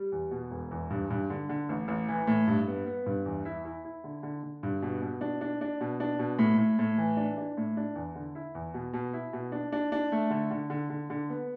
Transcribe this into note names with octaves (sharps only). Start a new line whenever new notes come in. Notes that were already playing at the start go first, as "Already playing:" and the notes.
Already playing: G3
E2
B2
E1
E2
G2
G2
D3
D3
A1
A1
E3
A2
G2
B3
B3
G2
E2
E4
E4
E4
D3
D3
D3
G2
B2
B2
D4
D4
D4
B2
D4
B2
A2
A2
A2
E3
D4
D4
A2
D4
E2
D3
E4
E2
B2
B2
E4
B2
D4
D4
D4
A3
D3
D3
D3
D3
D3
B3